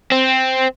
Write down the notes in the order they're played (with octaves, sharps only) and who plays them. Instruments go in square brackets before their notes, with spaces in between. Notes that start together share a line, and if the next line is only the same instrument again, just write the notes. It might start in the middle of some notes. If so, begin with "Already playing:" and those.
[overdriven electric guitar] C4